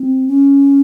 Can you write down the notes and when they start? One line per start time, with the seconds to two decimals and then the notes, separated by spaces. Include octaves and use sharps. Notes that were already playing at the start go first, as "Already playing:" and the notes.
Already playing: C4
0.28 C#4